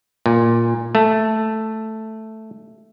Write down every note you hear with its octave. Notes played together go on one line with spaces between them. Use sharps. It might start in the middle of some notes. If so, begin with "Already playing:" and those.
A#2
A3